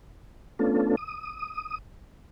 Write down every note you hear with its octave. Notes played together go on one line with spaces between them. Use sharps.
A3 B3 C#4 D4 F4 A4
D#6